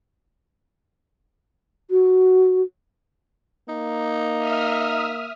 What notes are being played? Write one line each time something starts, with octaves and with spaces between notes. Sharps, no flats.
F#4
A#3 D#4
E5 D#6 F6